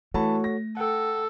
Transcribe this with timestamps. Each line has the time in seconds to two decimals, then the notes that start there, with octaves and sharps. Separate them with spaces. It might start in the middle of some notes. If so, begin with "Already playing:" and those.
0.14 E3 A3 F#4 A4 C#5 A5 B5
0.44 A#6
0.77 A4 F#5 G5